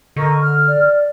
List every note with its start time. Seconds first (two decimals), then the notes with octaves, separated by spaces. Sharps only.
0.16 D3 A#4 D#5 C#6
0.39 F6
0.67 D5